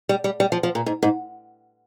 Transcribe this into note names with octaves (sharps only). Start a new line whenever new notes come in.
G3
G3
G3
F3
F3
A#2
G#2
G#2